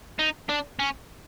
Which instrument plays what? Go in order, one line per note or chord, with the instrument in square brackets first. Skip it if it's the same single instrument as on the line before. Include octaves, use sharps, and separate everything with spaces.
[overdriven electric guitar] D#4
D4
C#4